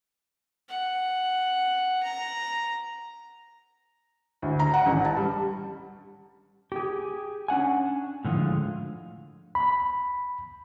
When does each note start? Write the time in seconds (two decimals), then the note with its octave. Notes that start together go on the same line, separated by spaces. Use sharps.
0.69 F#5
2.03 A#5
4.42 D2
4.59 A#5
4.74 F#5
4.86 A1
5.05 A5
5.17 G3
6.72 G4 G#4
7.48 C#4 D4 F#5 G#5
8.25 A2 D3 F3 G#3 F4
9.55 B5